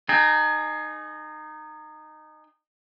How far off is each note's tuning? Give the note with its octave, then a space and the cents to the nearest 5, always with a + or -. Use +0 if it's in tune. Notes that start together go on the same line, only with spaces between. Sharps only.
D#4 -20 G#4 +25 G5 +35